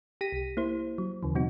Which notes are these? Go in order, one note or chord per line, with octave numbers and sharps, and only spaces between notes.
G4 A#6 B6 D#7
C2
A#3 E4 C5
F#3
D#2 C#3 E3
B2 F#3 C4 D#4 F#4